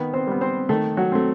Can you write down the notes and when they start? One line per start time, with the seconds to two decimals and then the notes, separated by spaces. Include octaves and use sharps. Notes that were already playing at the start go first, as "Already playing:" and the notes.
Already playing: D#3 B3 B4
0.14 C4 C5
0.27 G3 B3
0.41 C4 C5
0.69 D#3 A3 A4
0.97 F#3 F#4
1.12 A3 C4